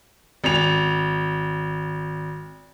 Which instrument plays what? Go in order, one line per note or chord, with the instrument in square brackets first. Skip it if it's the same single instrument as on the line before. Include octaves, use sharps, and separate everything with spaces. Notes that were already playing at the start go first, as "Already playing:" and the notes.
[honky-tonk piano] G#1 F7